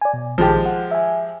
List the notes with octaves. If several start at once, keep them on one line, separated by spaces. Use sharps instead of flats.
D5 G#5
B2
A#1 D#3 F3 G#3 G4 A5
F#5
E5 G#5